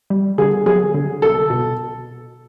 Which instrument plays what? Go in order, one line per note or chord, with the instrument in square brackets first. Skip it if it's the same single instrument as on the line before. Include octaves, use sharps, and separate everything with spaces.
[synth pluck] G3
[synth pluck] D3 [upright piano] G#4
[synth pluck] F#3 [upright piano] G#4
[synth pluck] D3
[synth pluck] C2 [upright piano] A4
[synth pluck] B2